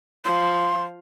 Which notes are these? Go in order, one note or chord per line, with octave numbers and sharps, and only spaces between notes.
F3 C6